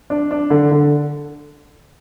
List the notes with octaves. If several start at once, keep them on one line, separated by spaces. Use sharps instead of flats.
D4
D4
D3
D3